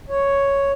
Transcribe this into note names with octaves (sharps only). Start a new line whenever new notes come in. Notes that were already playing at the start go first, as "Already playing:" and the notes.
C#5